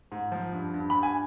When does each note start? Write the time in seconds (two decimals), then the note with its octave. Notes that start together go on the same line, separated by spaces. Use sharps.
0.11 G#2
0.32 F3
0.53 G2
0.74 G2
0.90 G2 B5
1.03 G#5